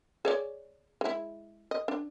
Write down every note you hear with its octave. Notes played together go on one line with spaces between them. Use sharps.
G#4 C#5 D5
G#3 E4
D#5
D4